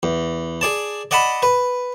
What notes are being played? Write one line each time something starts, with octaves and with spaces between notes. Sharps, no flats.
E2
G#4 D5 A5
D5 D#5 F#5 A5 B5
B4